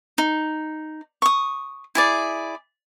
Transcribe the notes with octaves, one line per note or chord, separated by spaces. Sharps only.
D#4
C#6 D#6
E4 G#4 D5